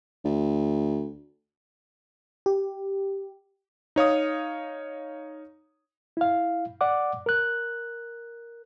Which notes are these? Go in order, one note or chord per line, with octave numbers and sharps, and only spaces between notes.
D2
G4
D#4 C#5 F5 D#6
E4 F5
D5 F#5 D6
A#4 F#6